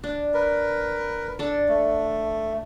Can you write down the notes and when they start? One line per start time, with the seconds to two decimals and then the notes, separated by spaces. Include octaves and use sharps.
0.04 D4
0.34 A#4 B4
1.39 D4 A4
1.68 A3